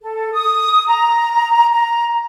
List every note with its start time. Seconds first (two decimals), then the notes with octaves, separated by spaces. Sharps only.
0.01 A4
0.33 D#6
0.87 A#5
1.71 A#5